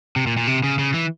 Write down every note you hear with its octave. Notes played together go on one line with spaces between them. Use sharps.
C3
A#2
A#2
C3
C#3
C#3
E3